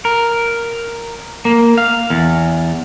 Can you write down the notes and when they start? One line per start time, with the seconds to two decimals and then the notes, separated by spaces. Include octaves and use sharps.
0.05 A#4
1.45 A#3
1.78 F5
2.10 E2